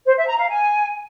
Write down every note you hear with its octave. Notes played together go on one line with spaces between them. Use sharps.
C5
E5
A#5
F5
G#5